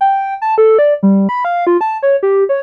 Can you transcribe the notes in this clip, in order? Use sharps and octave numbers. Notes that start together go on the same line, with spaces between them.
G5
A5
A4
D5
G3
B5
F5
F4
A5
C#5
G4
C#5